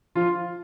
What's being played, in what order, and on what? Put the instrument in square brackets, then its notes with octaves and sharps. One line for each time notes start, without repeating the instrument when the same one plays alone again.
[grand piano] F3 F4